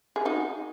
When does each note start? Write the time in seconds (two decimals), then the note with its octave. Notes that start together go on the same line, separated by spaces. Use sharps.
0.16 G#4
0.25 D#4 F#4